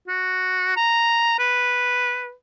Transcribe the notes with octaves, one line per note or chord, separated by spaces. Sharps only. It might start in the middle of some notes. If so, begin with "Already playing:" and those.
F#4
A#5
B4